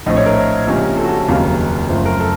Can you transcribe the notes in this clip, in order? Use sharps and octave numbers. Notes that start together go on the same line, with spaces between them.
A#1 A2 A3 C4 D#5
C#5
A#4
C#2 C3 F3 A#3 C#4
A4
F#4
A4
F1 D#2 C#3 F#3 A#3
F#1 F#2 F3 A3 C5
A#4
A4